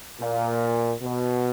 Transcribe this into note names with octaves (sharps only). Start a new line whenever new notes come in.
A#2
B2